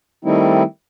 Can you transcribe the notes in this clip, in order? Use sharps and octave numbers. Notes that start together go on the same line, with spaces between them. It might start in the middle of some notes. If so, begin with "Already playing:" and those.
D#3 G3 A3 C4 D#4 E4